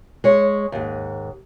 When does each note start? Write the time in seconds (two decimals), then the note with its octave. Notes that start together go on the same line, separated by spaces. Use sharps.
0.24 G#3 C#5
0.72 D#2 G#2